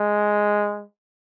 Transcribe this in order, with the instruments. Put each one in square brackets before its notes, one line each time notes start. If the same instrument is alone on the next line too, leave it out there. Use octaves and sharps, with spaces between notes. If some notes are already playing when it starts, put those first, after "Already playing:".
Already playing: [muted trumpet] G#3